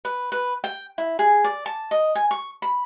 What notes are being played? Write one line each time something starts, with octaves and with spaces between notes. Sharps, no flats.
B4
B4
G5
E4
G#4
D5
A5
D#5
G#5
C#6
B5